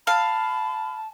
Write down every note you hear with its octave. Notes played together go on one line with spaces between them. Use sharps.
F5 A5 B5